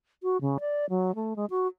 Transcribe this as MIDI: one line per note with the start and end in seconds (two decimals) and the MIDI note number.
0.23 0.37 66
0.41 0.58 49
0.60 0.86 74
0.90 1.14 54
1.15 1.36 57
1.36 1.45 56
1.50 1.67 66